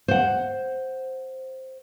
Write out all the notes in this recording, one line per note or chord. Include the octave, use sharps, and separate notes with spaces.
C5 F#5